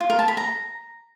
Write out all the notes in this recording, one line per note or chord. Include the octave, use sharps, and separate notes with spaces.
F4
A#4
A5
B5
A#5